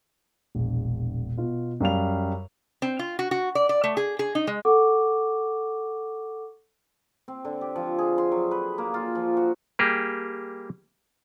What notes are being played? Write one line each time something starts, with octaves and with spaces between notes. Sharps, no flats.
E1 A#1
B2 F4
F#2 G3 F5 F7
C4
F4
F#4
F#4
D5
D5
A3
G#4
G#4
D#4
G#3
A4 F#5 C#6 D6
C4
D3
G4
F3
G#4
C6
F#3
B4
A#3
F4
F3
F#4
G3 A#3 G4 G#4